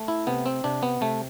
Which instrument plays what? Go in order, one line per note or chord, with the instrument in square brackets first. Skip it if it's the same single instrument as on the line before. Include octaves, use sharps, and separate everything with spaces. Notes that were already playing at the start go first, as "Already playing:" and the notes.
Already playing: [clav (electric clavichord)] A3
E4
C3 B3
C4
C3 D4
B3
C3 A3